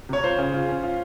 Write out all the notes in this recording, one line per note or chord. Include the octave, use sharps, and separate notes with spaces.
C3 C#5
F4 C5
C#3
F4
C#4
F4